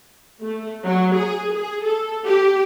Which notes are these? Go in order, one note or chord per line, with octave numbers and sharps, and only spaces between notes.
A3
F#3
G#4
G#4
A4
G4